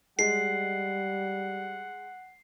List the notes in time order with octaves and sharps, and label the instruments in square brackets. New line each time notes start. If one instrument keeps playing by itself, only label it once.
[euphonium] G3 [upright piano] G#3 [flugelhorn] F#5 [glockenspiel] C7